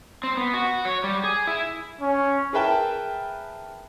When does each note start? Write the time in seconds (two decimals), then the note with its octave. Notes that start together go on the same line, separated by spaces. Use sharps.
0.23 C4
0.37 B3
0.54 F#4
0.85 C#5
1.04 G3
1.24 G#4
1.47 E4
2.01 C#4
2.53 G#4 A#4 B4 E5 G5 A5